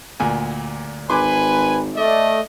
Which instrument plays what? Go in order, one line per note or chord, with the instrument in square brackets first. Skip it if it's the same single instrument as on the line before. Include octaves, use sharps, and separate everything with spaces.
[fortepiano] D2 A#2 G#5
[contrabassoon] G#1 [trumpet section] B4 G#5 [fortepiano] C6 D6
[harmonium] A3 [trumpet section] D5 D#5